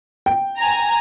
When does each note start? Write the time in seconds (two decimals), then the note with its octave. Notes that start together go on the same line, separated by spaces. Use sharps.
0.26 G5
0.58 G#5 A#5